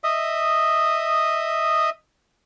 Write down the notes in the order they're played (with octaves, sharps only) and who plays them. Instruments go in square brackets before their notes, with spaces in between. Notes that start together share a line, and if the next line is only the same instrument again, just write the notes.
[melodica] D#5 E5 D#6